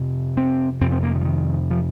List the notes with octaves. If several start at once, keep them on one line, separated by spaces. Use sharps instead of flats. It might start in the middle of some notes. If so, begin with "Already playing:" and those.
Already playing: F2 C3
C4
F2 C3 C4
C4
A#3
D#3
F3
D#3
F3